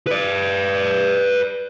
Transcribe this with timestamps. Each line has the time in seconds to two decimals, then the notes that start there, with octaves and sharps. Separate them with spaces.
0.07 B4 D5